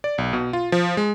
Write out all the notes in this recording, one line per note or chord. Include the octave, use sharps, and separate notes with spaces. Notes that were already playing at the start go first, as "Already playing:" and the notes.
D5
B1
B2
F4
F3
G#3